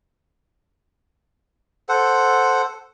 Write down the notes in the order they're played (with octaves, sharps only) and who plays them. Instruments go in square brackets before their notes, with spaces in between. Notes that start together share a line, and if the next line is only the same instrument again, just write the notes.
[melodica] A4 C5 F#5